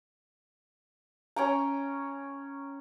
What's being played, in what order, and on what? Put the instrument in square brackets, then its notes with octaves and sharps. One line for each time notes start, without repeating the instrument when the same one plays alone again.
[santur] C#4 G5 A#5